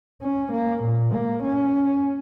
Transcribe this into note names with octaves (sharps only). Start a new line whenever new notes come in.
C#4
A#3
A#2
A#3
C#4